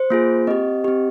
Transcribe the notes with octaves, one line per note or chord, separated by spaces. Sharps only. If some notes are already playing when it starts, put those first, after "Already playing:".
Already playing: C5
A#3 F4 G#4
C4 G4 D#5
C4 G4